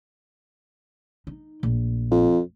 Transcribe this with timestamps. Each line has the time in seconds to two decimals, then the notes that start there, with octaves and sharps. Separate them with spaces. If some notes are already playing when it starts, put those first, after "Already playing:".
1.27 D#4
1.63 A#1
2.11 F2